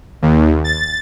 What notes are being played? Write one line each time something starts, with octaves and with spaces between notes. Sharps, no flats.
D#2
A6